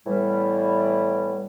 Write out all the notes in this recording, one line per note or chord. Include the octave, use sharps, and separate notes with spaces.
A2 E3 G3 B3